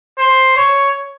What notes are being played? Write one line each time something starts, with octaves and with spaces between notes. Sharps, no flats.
C5
C#5